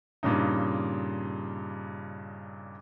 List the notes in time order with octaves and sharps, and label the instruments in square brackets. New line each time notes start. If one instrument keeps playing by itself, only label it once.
[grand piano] G2 A#2 C#3 D#4